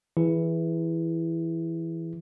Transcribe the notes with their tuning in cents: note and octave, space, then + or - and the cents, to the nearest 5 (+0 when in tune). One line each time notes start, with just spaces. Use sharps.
E3 +0 E4 +0 G#4 -10